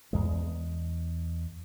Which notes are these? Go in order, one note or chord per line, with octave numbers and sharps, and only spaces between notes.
E2 G#3